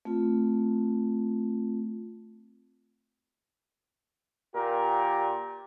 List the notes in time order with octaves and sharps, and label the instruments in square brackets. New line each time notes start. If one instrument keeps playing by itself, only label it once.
[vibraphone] A3 C4 F4
[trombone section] A#2 G4 A#4